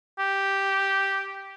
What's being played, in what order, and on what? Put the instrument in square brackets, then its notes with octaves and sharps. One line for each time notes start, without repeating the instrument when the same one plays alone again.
[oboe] G4